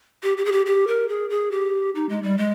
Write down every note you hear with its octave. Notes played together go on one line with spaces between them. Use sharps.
G4
G4
G#4
G4
G4
A#4
G#4
G#4
G4
D#4
G#3
G3
G#3